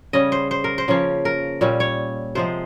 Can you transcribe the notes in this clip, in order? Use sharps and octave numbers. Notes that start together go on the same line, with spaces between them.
C#3 G3 C#4 D#5
C5
C5
A#4
C5
C#3 F3 A#3 C#4
A#4
A#2 G3 C#4
C#5
C3 F3 G#3 C5